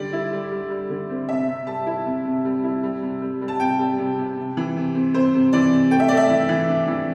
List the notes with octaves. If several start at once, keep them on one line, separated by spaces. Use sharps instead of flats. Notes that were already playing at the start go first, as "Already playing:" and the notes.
Already playing: D3 G3 D5
E4
G3
G3
G3
D3
C4
C3 E5
C3
G3 A5
E4
C3
C3
G3
E4
G3
C3
G3
G3
A5
C3 G5
G3
C3
C3
C3
E3
C3
C4
C4 C5
C3
E3 D5
C3
A3 G5
E5
A3 D5
E5
E3
E3
D4
E3